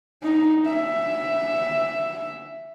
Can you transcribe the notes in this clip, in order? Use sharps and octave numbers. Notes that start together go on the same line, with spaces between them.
D#4
E5